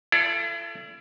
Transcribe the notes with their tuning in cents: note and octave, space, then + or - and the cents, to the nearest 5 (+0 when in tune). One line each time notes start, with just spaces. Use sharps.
E4 +40 A4 +0 D5 -5